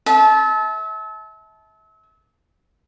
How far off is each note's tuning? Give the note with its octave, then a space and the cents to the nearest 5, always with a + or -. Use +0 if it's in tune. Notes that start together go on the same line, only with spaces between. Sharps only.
E5 -35 A5 -25